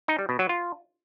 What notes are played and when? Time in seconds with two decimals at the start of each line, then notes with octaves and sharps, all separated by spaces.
0.08 D#4
0.19 G3
0.29 B2
0.39 F#3
0.49 F4